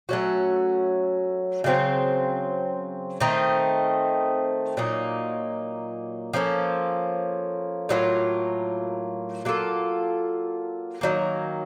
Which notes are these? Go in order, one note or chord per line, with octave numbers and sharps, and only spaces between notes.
F#3 A3 C#4 F#4
C#3 F#3 C4
D#3 A3 C4 D#4
A#2 F#3 A#3 D#4
F3 A#3 C#4 A4
A2 F#3 A#3 F4
F#3 A#3 F4 A4
D#3 F#3 A#3